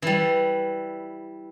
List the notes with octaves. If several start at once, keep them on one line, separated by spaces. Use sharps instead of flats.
E3 G3